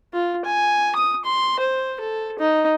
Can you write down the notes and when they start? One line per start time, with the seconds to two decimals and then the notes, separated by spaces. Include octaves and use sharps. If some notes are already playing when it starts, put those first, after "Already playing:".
0.14 F4
0.45 G#5
0.95 D#6
1.25 C6
1.60 C5
2.00 A4
2.39 D#4